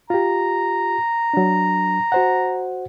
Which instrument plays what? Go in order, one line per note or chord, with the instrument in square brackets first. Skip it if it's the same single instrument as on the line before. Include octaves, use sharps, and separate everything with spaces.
[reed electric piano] F4 G4 [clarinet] A#5
[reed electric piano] F#3 D4
F#4 C5 F#5